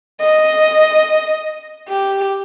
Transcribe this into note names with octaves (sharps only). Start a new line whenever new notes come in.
D#5
G4